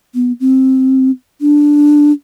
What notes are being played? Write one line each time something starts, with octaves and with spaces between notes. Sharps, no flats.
B3
C4
D4